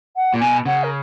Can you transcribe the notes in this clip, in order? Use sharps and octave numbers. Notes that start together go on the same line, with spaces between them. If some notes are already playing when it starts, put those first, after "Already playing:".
F#5
A#2
B2 G#5
C#3 F#5
A#4